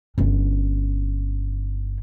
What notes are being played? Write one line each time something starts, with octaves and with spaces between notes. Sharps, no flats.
G1 C#4